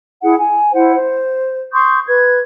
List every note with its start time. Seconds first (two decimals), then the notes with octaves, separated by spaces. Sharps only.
0.22 E4 G#4 F#5
0.38 G#5
0.73 E4 C5 F#5
0.95 C5
1.72 C6 C#6 D#6 G6
2.07 B4 G#6